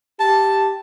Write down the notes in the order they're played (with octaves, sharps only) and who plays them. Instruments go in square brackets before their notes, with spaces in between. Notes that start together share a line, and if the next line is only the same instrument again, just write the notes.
[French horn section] G4 [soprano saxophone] A5